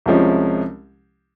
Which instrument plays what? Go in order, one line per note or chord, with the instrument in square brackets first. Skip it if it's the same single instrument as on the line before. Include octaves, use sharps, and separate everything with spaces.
[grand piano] C2 C3 F3 G#3 C#4